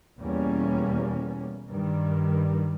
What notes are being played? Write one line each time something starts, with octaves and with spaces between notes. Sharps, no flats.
E2 B2 G3 A#3 C#4
G2 D#3 G3